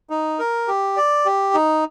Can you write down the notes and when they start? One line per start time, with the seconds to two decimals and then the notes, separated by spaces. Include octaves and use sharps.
0.10 D#4
0.39 A#4
0.68 G4
0.97 D5
1.25 G4
1.54 D#4